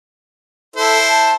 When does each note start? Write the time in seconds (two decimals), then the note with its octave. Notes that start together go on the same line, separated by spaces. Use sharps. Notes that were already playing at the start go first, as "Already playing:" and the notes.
0.76 E4 A4 C5
1.09 A5